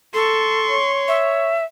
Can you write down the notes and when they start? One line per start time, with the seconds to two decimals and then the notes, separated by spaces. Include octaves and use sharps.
0.14 A4 C6 C#6
0.70 C#5
1.08 E5